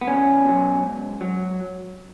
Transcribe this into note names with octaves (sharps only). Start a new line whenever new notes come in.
B3
E2 C#4
B2 F#3
G#2
F#3